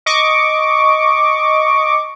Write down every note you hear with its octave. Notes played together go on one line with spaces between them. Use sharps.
D#5 C#6 D6